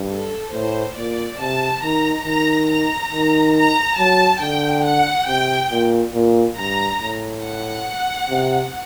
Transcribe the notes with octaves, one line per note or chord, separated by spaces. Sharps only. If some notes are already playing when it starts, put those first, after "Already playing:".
Already playing: G2
A4
A2 C5
A#2 D5
C3 A5
D#3 A#5
D#3 A#5
A#5
D#3
A#5
F#3 A5
D3 G5
F#5
C3 G5
A#2
A#2
G2 A#5
A2
F#5
C3